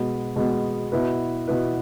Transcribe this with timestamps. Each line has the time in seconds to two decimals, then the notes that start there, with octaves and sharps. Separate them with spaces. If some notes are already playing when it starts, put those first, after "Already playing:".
Already playing: B2 G#3 B3
0.36 B2 G#3 B3
0.92 B2 B3 E4 B4
1.48 B2 B3 E4 B4